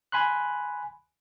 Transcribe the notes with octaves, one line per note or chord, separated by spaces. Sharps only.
G#5 B5 C6 F#6